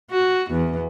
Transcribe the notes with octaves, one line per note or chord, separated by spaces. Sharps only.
F#4
E2